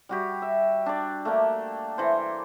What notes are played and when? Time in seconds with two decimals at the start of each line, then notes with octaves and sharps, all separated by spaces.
0.09 G3 F#4 G4
0.42 E5
0.86 D4 D5
1.25 A3 A#3 D4
1.98 E3 C5